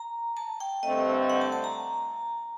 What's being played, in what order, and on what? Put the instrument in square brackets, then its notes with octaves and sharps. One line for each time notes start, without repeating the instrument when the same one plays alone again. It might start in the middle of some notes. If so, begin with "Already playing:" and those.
Already playing: [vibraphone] A#5
A5
G5
[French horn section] G2 D3 A3 C4 [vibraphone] D#5
[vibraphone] F#5
A5
A5
A#5